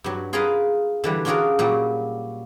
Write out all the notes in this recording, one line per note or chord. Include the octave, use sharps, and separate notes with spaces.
G2 F#3
F4 G#4 A#4 B4 D#5 F5
D3 E3 G3
C#4 D4 F4 F#4 G#4 A#4
A#2 F#3 G3